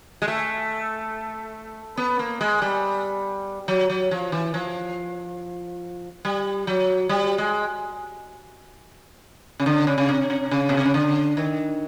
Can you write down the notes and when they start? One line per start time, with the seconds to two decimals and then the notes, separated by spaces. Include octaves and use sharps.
0.22 G#3
0.28 A3
1.97 B3
2.19 A#3
2.41 G#3
2.62 G3
3.68 F#3
3.90 F#3
4.11 F3
4.32 E3
4.54 F3
6.25 G3
6.67 F#3
7.09 G3
7.38 G#3
9.60 C#3
9.66 D3
9.87 C#3
9.98 C#3
10.09 C3
10.30 C3
10.51 C#3
10.69 B2
10.77 C3
10.85 C#3
10.94 D3
11.37 D#3